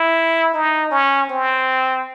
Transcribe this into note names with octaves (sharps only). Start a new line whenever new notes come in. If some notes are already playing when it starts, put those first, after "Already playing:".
Already playing: E4
D#4
C#4
C4